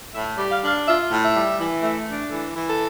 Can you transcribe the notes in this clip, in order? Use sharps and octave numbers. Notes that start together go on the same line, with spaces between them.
A2 E5
G3
F5
D4 F5
F4 E5
A2
E5
G3
E3
A3
D4
E3 A4
E3
A4